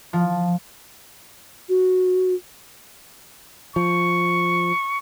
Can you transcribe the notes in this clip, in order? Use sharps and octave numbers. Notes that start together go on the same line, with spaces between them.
F3
F#4
F3 C#6